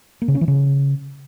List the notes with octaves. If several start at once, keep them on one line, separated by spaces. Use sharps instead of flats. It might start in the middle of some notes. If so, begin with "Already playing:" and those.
A#3
C#3
C#4
E3
C#3